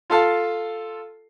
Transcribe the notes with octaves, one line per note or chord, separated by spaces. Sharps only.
F4 A4 F5 A5